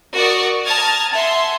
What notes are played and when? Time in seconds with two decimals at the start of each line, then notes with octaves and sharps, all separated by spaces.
0.13 F#4 A#4 D5 C#6 D#6
0.64 A5 A#5 D#6 F6 G#6 A6
1.13 E5 F#5 G#5 A5 C6